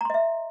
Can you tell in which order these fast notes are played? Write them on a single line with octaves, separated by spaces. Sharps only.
A#5 C6 D#5 E5